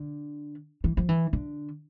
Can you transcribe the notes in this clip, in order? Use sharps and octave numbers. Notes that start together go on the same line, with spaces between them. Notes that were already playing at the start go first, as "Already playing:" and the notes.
Already playing: D3
E3
F3
E3
D3